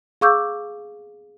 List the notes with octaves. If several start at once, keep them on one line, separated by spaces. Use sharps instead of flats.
G#4 F5 C#6 D6 E6 G6